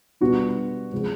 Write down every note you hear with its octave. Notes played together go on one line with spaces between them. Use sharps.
B2 G3 B3 D4 F4 F#4
C3 F3 G#3